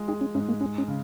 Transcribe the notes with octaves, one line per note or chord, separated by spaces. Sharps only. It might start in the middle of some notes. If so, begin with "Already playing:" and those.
Already playing: G#3 F4
D#4 G#4
C#4
G#2 C#4
A#3
G#3 C#4
C#4
C#3